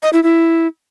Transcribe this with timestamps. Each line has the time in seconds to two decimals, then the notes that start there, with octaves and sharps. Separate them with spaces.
0.03 D#5
0.13 E4
0.23 E4